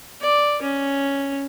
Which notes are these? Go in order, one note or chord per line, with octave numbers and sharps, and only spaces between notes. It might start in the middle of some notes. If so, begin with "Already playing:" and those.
D5
C#4